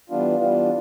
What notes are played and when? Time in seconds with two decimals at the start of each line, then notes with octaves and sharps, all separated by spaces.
0.10 E3 G3 B3 D4 F4
0.39 E3 G3 B3 D4 F4